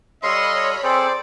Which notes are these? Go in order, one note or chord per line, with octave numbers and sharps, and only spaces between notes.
G3 A4 C#5 D#5 F5 B5 C6
C4 G#4 A4 C5 D5